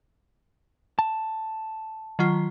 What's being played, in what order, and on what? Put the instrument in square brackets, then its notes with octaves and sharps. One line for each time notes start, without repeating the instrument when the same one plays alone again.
[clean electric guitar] A5
[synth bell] D#3 F#3 F4